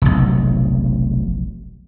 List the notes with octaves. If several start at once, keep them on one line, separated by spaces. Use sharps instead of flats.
F1 B1